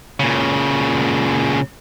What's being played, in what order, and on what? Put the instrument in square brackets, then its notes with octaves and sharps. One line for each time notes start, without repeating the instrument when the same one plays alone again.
[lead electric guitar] A#2 C#3